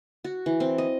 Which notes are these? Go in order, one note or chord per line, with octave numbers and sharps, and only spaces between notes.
F#4
E3
C4
D#5